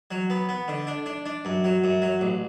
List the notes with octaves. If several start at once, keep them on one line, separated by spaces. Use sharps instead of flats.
F#3
B3
B3
D3
D4
D4
D4
F#2
F#3
F#2
F#3
A1